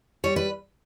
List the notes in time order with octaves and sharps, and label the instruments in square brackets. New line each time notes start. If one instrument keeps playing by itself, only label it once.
[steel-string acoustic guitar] G3 C#5
B4